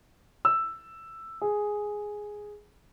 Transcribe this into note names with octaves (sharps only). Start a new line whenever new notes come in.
E6
G#4